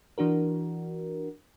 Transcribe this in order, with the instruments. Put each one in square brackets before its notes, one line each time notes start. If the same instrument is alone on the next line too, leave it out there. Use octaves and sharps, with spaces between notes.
[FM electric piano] E3 D4 F#4 A#4